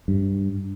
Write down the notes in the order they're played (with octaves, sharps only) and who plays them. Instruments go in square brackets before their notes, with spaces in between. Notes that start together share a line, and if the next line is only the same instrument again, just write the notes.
[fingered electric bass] G2